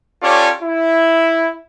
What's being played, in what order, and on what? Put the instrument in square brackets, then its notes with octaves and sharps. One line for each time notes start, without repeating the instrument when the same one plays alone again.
[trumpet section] C#4 F4 G4 A4 C#5 D5
E4